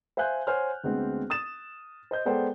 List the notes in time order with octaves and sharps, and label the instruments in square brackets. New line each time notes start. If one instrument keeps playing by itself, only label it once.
[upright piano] C5 E5 F5 G#5 F#6 G6
C5 C#5 F#5 G#5 F6
D2 G#3 B3 C4
D#6 A6 E7
C5 D#5 G6
G#3 B3 A4 C5 D5 G5